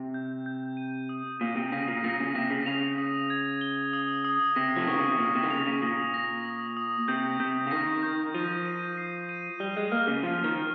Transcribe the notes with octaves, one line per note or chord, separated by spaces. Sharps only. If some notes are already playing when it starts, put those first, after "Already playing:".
Already playing: C3
G6
G6
D#7
D#6
A#2 D#7
C3
C#3 A#6
A#2
A#2 A#6
C#3
C3 A#6
C#3
C#3 F7
D#6
G#6
G7
D#6
D#6
C3 A#6
F3
D#3 C#6
C#3
C3
A#2 C#6
C3
D#3
C#3 F7
C#3
A#2 D#6
A#6
D#6
D#6
C3 G6
C3 G6
C#3
D#3 A#6
G6
F3 D#7
D#7
C7
D#7
G3 G7
G#3
A#3 F6
C#3
F3 G7
D#3
F6